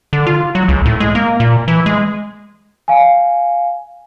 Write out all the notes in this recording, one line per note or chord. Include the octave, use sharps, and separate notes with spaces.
D3
F4
F#3
C#2
A2
G#3
A#3
A#2
E3
G#3
F5 G#5